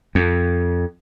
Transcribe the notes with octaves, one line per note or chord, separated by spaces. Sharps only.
F2